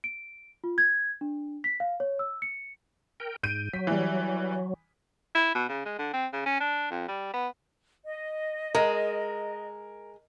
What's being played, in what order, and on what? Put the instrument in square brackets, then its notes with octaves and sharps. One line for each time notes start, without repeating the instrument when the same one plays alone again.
[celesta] D7
F4
G#6
D4
B6
F5
C#5
E6
C#7
[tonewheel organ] A#4 G5
[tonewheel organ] G#2 [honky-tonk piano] G6 D7 D#7
[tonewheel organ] F#3 [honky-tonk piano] B6
[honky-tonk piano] E3 G3
[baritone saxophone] E4
B2
C#3
G#3
D3
C4
C#3
C#4
D4
F2
G3
B3
[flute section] D#5
[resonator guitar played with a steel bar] G#3 [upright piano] A#4